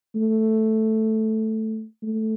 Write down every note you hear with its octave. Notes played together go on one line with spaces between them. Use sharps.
A3
A3